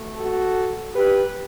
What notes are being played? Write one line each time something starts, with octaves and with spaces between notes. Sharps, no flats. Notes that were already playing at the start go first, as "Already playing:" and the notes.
Already playing: B2 A3
F#4 A4
G4 B4